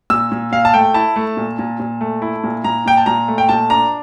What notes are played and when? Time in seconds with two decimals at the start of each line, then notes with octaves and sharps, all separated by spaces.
0.10 A#2 E6
0.32 A#2
0.52 A#2 F5
0.65 A5
0.74 A3 G5
0.94 E4 A5
1.16 A3
1.37 A#2
1.59 A#2
1.80 A#2
2.01 A3
2.22 E4
2.44 A#2
2.64 A#2 A#5
2.86 A#2 G5
2.97 A5
3.06 A#2 A#5
3.28 A3
3.38 G5
3.49 A#2 A5
3.70 D4 A#5